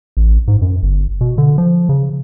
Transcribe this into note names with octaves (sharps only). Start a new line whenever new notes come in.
A1
G#2
F#2
G1
B2
D3
F3
C#3